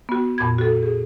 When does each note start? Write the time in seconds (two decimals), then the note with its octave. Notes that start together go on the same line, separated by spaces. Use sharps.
0.09 B3 F#4
0.38 F2 A#2 B5 G#6
0.58 F#4 A4
0.83 G#4